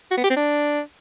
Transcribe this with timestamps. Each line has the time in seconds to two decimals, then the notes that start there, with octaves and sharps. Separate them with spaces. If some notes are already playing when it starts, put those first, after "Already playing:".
0.11 F#4
0.18 B3
0.24 G4
0.30 C4
0.37 D4